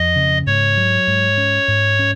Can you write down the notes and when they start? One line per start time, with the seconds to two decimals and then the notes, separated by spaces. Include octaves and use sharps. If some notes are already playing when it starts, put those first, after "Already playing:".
Already playing: F2 D#5
0.16 C#3
0.47 G#2 C#5
0.77 F#3
1.08 G#2
1.38 C#4
1.68 G#2
1.99 C#4